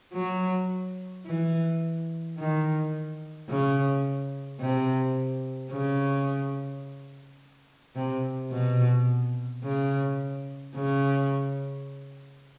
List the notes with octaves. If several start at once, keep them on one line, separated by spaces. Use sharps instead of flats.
F#3
E3
D#3
C#3
C3
C#3
C3
B2
C#3
C#3